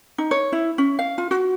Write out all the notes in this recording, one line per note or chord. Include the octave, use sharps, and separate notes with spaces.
D#4
C#5
E4
C#4
F5
F4
F#4